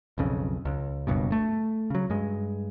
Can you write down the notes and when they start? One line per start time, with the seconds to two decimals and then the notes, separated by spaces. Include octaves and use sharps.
0.18 B1 F2 C#3
0.65 C#2
1.07 F#1 C#2 G2 B2
1.32 A3
1.90 C#3 F#3
2.10 G2 G#3